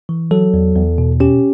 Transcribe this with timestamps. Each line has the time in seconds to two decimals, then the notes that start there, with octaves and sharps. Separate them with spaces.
0.09 E3
0.31 F#3 A4
0.54 E2
0.76 E2
0.98 B2
1.20 C#4 G4